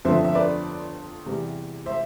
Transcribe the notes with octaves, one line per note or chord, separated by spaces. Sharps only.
G1 F2 D3 F3 C4 C5 E5
E5
B4 D5
E2 C3 E3 G3
C5 E5